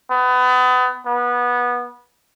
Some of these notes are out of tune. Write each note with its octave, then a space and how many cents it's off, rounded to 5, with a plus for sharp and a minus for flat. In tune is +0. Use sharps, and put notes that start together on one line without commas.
B3 +30
B3 -20